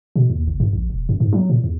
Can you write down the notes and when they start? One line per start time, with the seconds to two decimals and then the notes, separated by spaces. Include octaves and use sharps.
0.16 B2
0.30 D#2
0.48 F#1
0.60 G2
0.73 A#1
0.90 E1
1.09 F#2
1.20 G#2
1.33 F#3
1.50 A#2
1.64 E2